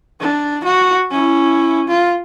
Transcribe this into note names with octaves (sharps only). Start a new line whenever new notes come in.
D4
F#4
C#4 E4
F4